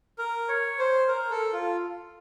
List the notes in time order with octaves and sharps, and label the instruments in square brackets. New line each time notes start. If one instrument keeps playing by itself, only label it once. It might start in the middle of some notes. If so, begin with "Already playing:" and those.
[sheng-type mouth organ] A#4
C#5
C5
A#4
A4
F4